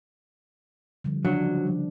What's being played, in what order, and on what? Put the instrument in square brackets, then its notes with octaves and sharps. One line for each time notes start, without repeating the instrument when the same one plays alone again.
[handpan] D3 F3 G3
[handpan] C#3 F3 D4 [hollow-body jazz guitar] F#3